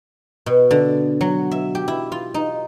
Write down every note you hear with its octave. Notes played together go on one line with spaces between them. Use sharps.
B2
D3
F#3
E5
G4
E4
F4
D#4